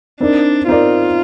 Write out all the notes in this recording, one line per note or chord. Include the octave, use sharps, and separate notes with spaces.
C4 D4 D#4 A#4 D5
C4 D#4 F4 A#4 D5